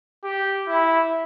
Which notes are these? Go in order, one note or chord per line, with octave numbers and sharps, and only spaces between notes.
G4
E4